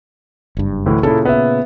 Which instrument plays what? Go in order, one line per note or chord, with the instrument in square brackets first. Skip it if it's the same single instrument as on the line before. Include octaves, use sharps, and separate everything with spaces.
[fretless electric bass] F#1 G2
[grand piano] D2 A2 E3
[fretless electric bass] A#2 C#3 [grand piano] E4 A4
[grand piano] B3 E5